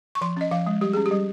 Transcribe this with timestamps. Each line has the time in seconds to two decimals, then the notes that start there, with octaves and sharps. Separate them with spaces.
0.15 C#6
0.21 F3 C6
0.37 C#4 D#5
0.51 F3 F5
0.67 G#3
0.81 G3 G4
0.93 C#4 G#4
1.06 G4
1.11 G3